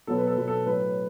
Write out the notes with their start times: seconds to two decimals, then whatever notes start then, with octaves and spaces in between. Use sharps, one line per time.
0.07 B2 F#3 B3 A4
0.18 B4
0.27 A4
0.37 B2 F#3 B3 B4
0.48 A4
0.66 A2 F#3 A3 B4